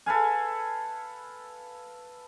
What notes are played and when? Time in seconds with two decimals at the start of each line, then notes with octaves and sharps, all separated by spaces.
0.06 A4 B4 F5 G#5